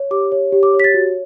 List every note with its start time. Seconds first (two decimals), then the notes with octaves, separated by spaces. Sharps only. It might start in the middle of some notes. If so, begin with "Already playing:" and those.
Already playing: C#5
0.11 G4 D6
0.32 C#5
0.52 G4
0.63 D6
0.74 C#5
0.80 B6
0.84 A6
0.94 F#4